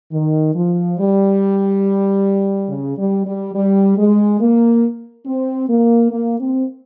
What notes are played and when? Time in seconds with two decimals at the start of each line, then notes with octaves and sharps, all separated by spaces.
0.12 D#3
0.55 F3
0.98 G3
2.69 C#3
2.98 G3
3.26 G3
3.54 G3
3.97 G#3
4.40 A#3
5.26 C4
5.69 A#3
6.11 A#3
6.40 C4